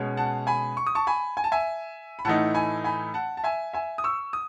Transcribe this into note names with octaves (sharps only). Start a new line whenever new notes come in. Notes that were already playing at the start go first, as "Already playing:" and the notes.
Already playing: B2 G#3 C#4
F#5 A5
G#5 B5
C#6
D#6
A5 C#6
G#5 B5
G#5
A5
E5 G#5
B5
A2 E3 A3 D#4 F#5 A5
G#5 B5
G#5 B5
F#5 A5
A5
E5 G#5
E5 G#5
D#6
C#6 E6
D#6